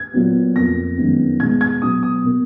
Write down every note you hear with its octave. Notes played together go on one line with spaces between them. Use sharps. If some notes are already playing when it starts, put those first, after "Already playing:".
Already playing: G#6
A#2 F#3 B3
F2 F3 A#3 A#6
F#2 D#3 G#3 B3
B2 G#3 B3 G#6
G#6
B2 F#3 B3 D#6
D#6
B2 A#3